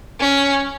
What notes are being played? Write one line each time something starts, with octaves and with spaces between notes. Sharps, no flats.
C#4